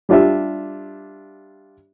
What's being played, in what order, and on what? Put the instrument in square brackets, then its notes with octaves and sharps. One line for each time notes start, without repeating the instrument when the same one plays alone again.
[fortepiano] G3 D4 F4 G4 E5